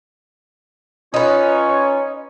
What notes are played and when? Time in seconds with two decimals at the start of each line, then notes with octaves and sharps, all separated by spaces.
1.14 C#4 D#4 F4 B4 C#5